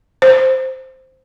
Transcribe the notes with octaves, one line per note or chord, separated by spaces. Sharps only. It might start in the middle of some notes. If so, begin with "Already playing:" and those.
C5